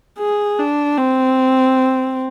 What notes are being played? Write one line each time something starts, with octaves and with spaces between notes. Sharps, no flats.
G#4
D4
C4